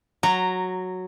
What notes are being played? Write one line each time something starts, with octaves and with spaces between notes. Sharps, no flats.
F#3 A#5